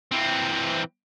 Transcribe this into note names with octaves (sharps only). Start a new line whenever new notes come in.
E3 C4